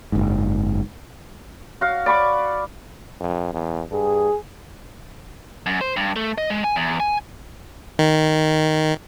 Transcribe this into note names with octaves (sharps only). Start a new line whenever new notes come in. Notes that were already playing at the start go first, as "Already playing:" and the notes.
F#1 G#2
F#4 F5
D5 B5 C#6 D6
F2
E2
G2 G#4
F#2
C5
G2
A3
D#5
G#3
G#5
E2
G#5
D#3